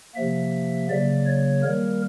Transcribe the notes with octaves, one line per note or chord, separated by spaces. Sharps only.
C3 F3 A#3 E5
C#3 F#3 A#3 D5
C#5
D#3 G3 A#3 A#4